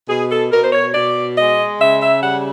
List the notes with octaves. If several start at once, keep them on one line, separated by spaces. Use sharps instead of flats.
B2 G#4
A4
B2 A#4
C5
C#5
B2 D5
G#3 D#5
C#3 E5
E5
G3 F#5